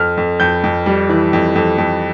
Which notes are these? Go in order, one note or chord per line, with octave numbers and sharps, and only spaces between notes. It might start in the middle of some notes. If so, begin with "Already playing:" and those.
Already playing: F2 F6
F2
F2 G6
F2
G3
E3
F2
F2
F2